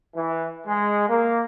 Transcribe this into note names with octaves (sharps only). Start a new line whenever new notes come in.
E3
G#3
A#3